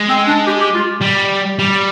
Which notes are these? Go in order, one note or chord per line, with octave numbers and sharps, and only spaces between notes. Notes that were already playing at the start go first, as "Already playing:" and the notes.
Already playing: G#3
C4
D4
G4
G4
F4
G3
G3